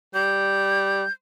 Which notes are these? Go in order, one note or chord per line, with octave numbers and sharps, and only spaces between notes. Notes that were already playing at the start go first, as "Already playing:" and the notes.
G3 G6